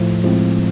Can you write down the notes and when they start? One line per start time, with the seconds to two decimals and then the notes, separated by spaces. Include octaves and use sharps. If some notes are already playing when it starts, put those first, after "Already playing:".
Already playing: A2 F3 A3
0.24 A2 F3 G#3 C4